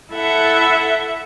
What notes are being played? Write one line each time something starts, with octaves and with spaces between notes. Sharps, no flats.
E4 A4 E5 F#5